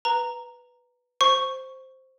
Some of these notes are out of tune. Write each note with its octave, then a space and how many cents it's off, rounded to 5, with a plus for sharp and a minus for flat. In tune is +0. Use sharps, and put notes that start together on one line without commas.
B4 +0 A#5 -5
C5 +0 C#6 +0